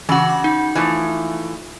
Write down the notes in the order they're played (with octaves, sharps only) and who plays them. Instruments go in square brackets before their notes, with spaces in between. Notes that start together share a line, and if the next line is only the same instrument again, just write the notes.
[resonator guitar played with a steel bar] C#3 F#4 [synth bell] E3 E6 F#7
[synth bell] D6
D#4
[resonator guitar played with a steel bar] E3 F3 A3